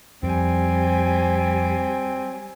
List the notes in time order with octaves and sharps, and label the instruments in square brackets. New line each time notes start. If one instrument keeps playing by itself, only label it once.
[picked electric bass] F2 [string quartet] G3 G#5 [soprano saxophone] C4